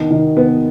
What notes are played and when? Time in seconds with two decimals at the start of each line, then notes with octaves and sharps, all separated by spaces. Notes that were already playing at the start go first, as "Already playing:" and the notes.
Already playing: B2 D#3
0.10 D#3
0.37 B3